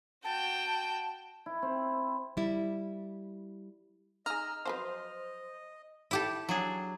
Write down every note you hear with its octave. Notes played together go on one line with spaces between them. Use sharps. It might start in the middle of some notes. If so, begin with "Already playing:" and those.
F#4 G5 A5
E4
C4
G3 E4
D#4 G#4 D#5 A#5 E6 F6
F3 F#3 B4 C5 D#5
E4 G4 A4
F#3 D4 G#4